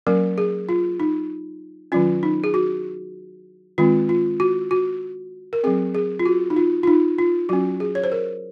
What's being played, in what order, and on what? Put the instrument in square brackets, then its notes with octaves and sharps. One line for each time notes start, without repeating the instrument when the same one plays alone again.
[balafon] F#3 A#3 C#4 A#4
G#4
F4
D#4
D#3 F#3 C#4 F4
D#4
G#4
F#4
D#3 G#3 C4 F4
F4
F#4
F#4
A#4
F#3 C4 G#4
G#4
F4
F#4
D#4
F4
F4
D#4
F4
F#3 C#4 F#4
G#4
C#5
C5
A#4